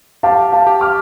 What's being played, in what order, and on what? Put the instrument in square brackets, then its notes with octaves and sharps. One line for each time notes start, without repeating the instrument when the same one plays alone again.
[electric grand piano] G4 [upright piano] F5 A5
[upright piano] F5 A5
[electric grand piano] G4
[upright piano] D6 F6